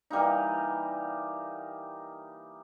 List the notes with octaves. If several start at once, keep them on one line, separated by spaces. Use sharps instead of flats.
E3 G3 A#3 D#4